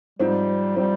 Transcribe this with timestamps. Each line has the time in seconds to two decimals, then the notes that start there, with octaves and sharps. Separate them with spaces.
0.19 G#2 F3 G3 C4
0.76 F3 G3 C4